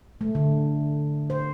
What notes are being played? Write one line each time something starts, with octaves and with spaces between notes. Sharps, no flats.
A3
D3
C5